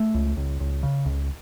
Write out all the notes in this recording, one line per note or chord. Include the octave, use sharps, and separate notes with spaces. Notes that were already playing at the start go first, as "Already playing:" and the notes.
Already playing: A3
C#2
C#2
C#2
C#3
C#2